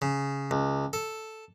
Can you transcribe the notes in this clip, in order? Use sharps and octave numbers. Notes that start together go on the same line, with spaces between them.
C#3
C#2
A4